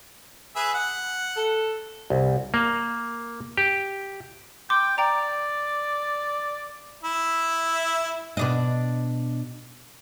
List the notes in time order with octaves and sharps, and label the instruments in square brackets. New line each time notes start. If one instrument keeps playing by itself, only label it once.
[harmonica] G#4 B4 E5
F#5
[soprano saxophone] A4
[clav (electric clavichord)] C2
A#3
G4
[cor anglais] G5 [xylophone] C6 D6
[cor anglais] D5 [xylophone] G5 A#5
[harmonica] E4 E5
[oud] B2 D4 D#5